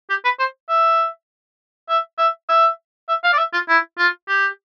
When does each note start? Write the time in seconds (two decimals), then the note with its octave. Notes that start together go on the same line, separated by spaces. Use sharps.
0.10 G4
0.24 B4
0.39 C5
0.69 E5
1.89 E5
2.18 E5
2.49 E5
3.09 E5
3.24 F5
3.33 D5
3.38 E5
3.53 F4
3.69 E4
3.98 F4
4.28 G4